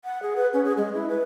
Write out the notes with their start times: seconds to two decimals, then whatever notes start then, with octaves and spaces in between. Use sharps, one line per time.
0.05 F#5
0.22 G#4
0.36 B4
0.53 C#4
0.65 G#4
0.78 G#3
0.95 E4
1.09 B4